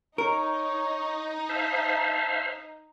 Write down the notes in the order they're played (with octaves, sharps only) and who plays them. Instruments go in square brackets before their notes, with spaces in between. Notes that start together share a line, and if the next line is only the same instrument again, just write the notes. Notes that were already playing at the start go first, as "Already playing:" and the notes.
[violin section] D#4 [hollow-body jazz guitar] A#4 [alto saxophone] C#5
[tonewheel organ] C5 E5 F5 [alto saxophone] A5